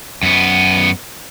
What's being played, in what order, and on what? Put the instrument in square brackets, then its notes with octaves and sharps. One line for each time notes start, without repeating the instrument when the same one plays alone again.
[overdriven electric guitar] F#2 B3